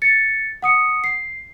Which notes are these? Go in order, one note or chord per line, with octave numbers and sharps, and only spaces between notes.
A6 C#7
F#5 D#6 C#7
C7